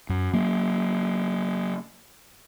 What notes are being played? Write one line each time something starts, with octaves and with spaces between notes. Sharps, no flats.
F#2
F#3 A#3